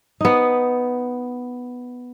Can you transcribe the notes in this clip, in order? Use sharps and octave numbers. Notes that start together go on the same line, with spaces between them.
B3 D#4